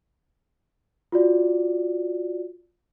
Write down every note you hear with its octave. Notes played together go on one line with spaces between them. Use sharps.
F4 F#4 D5